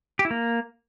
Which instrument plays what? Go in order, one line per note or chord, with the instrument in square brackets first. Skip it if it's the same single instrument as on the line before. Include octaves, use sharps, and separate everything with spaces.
[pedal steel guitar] G4
E4
A#3